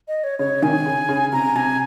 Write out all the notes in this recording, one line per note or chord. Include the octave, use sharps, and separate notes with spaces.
D#5
C#5
C#3 C#5
C3 D#3 G#5
C#3
C#3
C3 A#5
C3 G#5